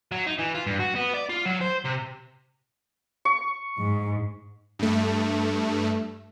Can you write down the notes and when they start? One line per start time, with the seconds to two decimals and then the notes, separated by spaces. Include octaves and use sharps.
0.12 F#3
0.27 D#4
0.39 E3
0.55 F4
0.66 G2
0.79 F#4
0.95 B3
1.14 D5
1.29 F4
1.45 F#3
1.61 C5
1.84 C3
3.25 C#6
3.80 G#2
4.79 G2 A3